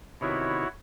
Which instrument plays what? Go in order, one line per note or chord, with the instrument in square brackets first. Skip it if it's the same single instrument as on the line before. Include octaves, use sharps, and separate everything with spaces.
[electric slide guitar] C3 D#3 B3 [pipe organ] E4 F#4 C#5